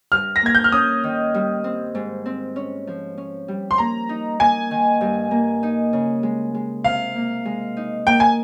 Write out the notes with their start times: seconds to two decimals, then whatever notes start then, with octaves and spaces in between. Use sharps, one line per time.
0.12 G2 F6
0.36 A#6
0.42 A#3 G#6
0.55 G6
0.64 F6
0.72 C#4 D#6
1.04 D#3
1.34 G3
1.64 C4
1.95 G#2
2.26 C4
2.56 C#4
2.87 F3
3.18 C#4
3.48 G3
3.71 C6
3.78 A#3 A#5
4.09 D#4
4.39 A#3 G#5
4.71 D#3
5.01 G2
5.31 A#3
5.63 D#4
5.93 C#3
6.23 G#3
6.55 G#3
6.84 C3 F5
7.15 A#3
7.45 G#3
7.77 D#4
8.07 A#3 G5
8.20 G#5